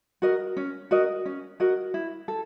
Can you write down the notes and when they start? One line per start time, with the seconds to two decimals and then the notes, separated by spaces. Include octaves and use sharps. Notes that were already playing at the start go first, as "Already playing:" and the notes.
0.22 F#4 A#4 D#5
0.57 C#4
0.91 F#4 A#4 D#5
1.26 C#4
1.60 F#4 A#4 D#5
1.94 E4
2.28 A4